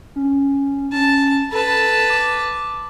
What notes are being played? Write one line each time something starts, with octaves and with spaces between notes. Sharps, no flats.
C#4
C#4 A5
A4 B4 A5
D6